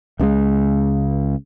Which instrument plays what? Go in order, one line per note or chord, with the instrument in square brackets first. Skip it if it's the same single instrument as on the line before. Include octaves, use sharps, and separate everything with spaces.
[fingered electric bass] C#2 C#3 G3 G#3